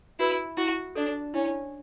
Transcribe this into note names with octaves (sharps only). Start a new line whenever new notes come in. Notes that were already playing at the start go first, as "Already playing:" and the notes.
E4 F#4 B4
E4 F#4
D4 A4 D5
C#4 E4